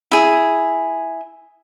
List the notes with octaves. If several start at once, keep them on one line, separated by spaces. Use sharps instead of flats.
E4 G#4